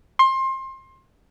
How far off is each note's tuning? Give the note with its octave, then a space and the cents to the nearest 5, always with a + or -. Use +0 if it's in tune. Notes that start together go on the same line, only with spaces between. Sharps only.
C6 +25